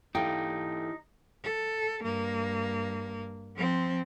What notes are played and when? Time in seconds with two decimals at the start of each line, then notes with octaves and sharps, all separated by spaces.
0.15 E3 D#4 E4 G4 A4 F5 G5
1.44 A4
2.04 G2 A#3
3.55 F3 C4